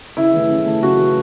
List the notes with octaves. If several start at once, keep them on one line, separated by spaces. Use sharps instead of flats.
C#3 E4
E3 A3
C#3
E3 A3
C#3 F#4
E3 A3